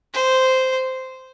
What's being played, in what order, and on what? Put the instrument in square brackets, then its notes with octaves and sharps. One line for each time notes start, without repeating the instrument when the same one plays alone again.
[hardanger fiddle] C5